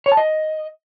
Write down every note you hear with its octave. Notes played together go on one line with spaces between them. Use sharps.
C#5
A5
D#5